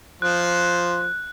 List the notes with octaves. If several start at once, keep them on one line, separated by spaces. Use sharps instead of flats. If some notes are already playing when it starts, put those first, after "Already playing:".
F3 C5 F#6